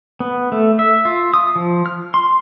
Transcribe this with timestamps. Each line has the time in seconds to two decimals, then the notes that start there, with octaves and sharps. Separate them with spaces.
0.20 B3
0.52 A3
0.79 E5
1.05 F4
1.34 D#6
1.56 F3
1.86 F6
2.14 C6